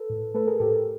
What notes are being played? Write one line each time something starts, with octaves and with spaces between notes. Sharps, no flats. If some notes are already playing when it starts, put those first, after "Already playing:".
Already playing: A4 B4
A2
A3 A4 B4
G#4 A#4
A2 G4 A4